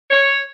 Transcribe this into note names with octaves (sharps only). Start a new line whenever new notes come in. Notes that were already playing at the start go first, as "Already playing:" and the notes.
C#5